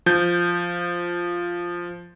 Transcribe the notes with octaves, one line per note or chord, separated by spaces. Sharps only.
F3 G6